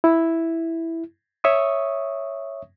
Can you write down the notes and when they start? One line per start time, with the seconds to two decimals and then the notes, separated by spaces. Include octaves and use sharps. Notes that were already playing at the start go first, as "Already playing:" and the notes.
0.04 E4
1.44 C#5 E5 C#6 D#6